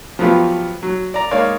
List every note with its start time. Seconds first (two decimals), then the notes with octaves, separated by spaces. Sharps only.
0.19 F3 F#3 A3 B3 F4 G4
0.83 F#3
1.14 D5 A#5
1.31 G#3 A#3 D#4 C#5 D5 F5